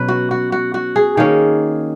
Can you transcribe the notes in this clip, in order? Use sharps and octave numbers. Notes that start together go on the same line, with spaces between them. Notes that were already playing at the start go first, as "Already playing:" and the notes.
Already playing: B2 F#3 C#4 B4
F#4
F#4
F#4
F#4
G#4
D#3 A#3 C#4 G#4